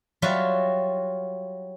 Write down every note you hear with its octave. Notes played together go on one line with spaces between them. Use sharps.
F#3 G3 F4 F#4 E5